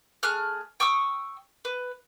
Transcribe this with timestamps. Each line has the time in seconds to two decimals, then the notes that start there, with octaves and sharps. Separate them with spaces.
0.23 A3 G#4 F6 F#6
0.80 G5 C#6 D#6 E6
1.65 B4